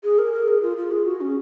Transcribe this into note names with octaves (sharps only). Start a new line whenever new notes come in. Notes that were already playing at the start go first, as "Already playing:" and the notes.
G#4
A#4
A#4
G#4
F4
F4
G#4
F#4
C#4